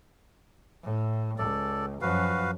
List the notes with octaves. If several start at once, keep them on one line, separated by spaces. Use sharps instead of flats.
A2
C#2 A4 D5
F#2 F3 F#4 B4 F5